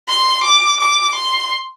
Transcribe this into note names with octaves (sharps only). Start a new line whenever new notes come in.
C6
D6
D6
C6